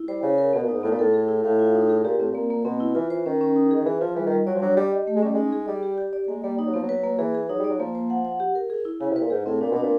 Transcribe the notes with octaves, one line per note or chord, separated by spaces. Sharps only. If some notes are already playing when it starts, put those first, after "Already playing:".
Already playing: E4
G3 C5
C#3 D5
A#4
B2 B3
A#2
G#2 D#4
A2 B3
A#2
A2 A4
G#4
E4
A2 F5
F4
D#4
G#4
A#2 G4
A2 C4
A#2 A#3
A#3
B2 C4
E4
E3 F4
E3 C5
D#3 C#4
C#4
D#4
D#3 G#4
E3 G#4
F3 F4
E3 G3
D#3
G3
F#3 D5
F3
F#3 D4
G3 G4
D#5
A3
G#3
G3 C#4
G#3 D#4
G#4
G3 D5
G4
G4
D5
G#3 A#3
G3 A#3
G3 D#4
F#3
F3 B3
F#3
B4
A#3
E3 G#4
G#4
F#3 D#4
G3 D5
F#3
F3 A#3
C5
F#5
F#5
G4
A#4
G#4
E4
C#3 E4
C3
B4
A#2
G#2 G#4
A2 C4
A#2 D4
B2 D4
A#2